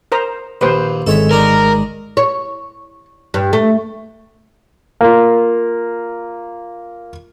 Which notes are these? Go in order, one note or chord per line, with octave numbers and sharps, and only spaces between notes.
A#4 C5 A#5
A#1 D#2 B4 C5
G#1 G#3 A4 C#5 E5
D#3 D4 A#4
C#5
G2
A3
A#3 F4